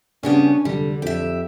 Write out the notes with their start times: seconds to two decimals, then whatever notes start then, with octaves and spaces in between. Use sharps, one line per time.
0.23 C#3 G3 B3 C#4 D4
0.65 F1 D3 G3
1.02 F2 G4 E5